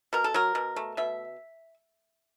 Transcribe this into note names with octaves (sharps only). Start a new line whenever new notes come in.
B2 A#4
A4
F#3 A#4
B2
A3
B2 E5